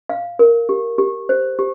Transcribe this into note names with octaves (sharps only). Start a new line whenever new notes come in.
F5
A#4
G4
G4
C5
G4